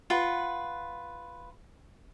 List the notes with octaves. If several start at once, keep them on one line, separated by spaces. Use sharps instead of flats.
F4 B4 F#5